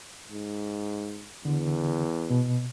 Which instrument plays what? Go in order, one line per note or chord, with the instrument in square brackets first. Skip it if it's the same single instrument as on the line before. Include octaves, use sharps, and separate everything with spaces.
[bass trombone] G#2
[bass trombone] E2 [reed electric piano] D3
[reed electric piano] B2